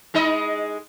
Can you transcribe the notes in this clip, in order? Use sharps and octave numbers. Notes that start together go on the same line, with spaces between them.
G#3 D#4 D#5